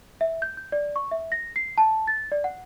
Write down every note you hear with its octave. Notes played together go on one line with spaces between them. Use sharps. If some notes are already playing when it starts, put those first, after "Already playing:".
E5
G6
G6
D5
C#6
E5
A#6
C7
A5
A6
D5
F#5